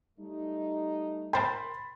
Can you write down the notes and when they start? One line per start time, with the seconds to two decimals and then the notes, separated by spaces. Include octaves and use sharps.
0.19 G3 A3 D#4
1.33 A#4 C5 G5 B5 C6 A6